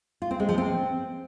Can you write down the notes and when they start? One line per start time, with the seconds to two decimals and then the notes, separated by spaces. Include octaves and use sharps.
0.22 F4
0.31 C4
0.40 G#3
0.49 F3
0.58 C4